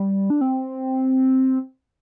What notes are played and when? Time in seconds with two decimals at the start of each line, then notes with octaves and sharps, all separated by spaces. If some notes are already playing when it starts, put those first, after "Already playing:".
Already playing: G3
0.30 D4
0.41 C4